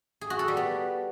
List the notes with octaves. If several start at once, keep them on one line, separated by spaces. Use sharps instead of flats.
G#4
F#4
A4
G3
B3